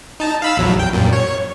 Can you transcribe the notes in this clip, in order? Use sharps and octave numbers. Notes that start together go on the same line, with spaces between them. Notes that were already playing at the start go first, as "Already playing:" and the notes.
D#4 A5
F5 B5 E6
A#1 E2 F#3
G5
F#2 A#2
C#5